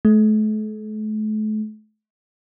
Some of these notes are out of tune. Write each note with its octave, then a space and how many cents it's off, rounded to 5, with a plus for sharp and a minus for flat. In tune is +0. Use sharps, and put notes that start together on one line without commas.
A3 -40